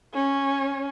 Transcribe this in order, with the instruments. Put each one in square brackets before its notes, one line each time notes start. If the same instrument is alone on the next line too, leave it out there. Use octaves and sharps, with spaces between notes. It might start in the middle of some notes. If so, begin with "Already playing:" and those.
[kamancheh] C#4